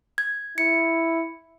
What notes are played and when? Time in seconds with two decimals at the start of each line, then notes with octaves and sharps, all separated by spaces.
0.18 G#6
0.58 E4 C#7